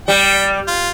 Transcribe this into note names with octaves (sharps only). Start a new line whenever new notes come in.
G3 G5
F4